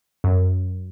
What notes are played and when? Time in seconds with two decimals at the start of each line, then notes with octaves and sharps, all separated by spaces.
0.24 F#2